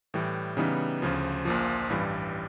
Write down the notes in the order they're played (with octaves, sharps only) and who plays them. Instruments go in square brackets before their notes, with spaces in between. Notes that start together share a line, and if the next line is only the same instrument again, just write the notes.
[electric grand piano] A2 E3 G3
C#3 E3 G3 B3 D#4
D2 C#3 F3
A#1 A#2 F3
A1 G2 E3 G3